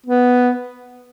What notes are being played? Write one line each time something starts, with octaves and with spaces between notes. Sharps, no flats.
B3